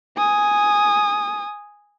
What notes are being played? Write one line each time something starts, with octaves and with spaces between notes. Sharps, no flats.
G#5 D#6